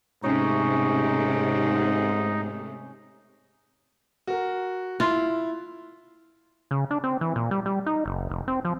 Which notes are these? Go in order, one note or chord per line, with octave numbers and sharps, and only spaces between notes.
G#2 C3 A3 C#4 D#4 C#5
F#4 A#4
E4 F4
C#3
D4
C4
E3
A#2
G3
G3
D#4
F#1
F1
C4
F3